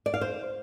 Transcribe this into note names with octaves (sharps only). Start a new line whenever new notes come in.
D5
F5
C5